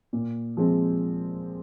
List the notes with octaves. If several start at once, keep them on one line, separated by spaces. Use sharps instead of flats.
A#2
F3 G#3 C4